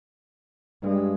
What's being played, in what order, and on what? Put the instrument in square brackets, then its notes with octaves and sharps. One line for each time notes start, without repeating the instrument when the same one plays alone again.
[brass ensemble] G2 [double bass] G#3